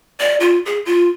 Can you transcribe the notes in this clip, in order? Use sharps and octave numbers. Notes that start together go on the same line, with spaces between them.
D5
F4
G#4
F4